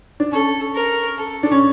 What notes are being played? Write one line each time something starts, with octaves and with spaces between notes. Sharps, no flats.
D4
C#4 A4
A#4
A4
D4
C#4